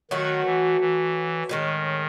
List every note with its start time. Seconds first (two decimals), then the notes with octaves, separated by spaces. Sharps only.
0.11 D#3 F#3 A3 D#4 F#4
0.45 E3
0.81 E3
1.49 A2 D#3 G#3 C#4